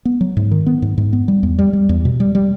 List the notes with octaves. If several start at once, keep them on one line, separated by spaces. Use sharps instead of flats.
B3
F#3
G#2
D#3
B3
G#2
G#2
B3
G3
E2
G3
G3
E2
B2
G3
G3